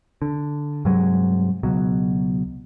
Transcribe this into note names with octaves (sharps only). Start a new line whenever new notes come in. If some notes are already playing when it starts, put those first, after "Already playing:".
D3
G2 C3 F#3 G#3
C#2 B2 F#3